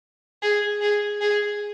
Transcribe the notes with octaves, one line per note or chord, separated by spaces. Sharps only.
G#4
G#4
G#4